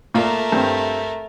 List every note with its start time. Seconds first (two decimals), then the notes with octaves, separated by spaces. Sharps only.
0.14 A#2 A3 A#4 F5
0.52 G2 C4